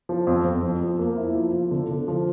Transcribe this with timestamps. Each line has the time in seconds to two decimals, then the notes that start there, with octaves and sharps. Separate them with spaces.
0.09 F3
0.27 F2
0.45 F2
0.63 F3
0.81 F3
0.99 A#3
1.17 E4
1.35 F3
1.53 F3
1.71 D3
1.89 D3
2.08 F3